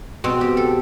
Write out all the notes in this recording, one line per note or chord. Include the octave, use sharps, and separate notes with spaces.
B2 C4
G4
A4